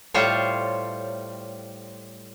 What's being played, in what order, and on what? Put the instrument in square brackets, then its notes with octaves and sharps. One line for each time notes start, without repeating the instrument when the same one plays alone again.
[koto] A2 G3 F4 C5 C#5